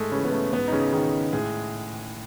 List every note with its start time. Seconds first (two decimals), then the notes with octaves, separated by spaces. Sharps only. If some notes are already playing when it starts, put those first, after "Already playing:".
Already playing: G#2 G#3 A3 G#4 A4
0.12 C#3 E3 G#3 C#4
0.25 B3
0.32 A3
0.52 G#2 B3
0.68 D#4
0.72 C#3 C#4
0.93 D#3 G#3 D#4
1.32 A2 G#3 G#4